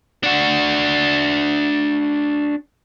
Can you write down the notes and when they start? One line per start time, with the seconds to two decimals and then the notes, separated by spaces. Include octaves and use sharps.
0.23 D4 F#4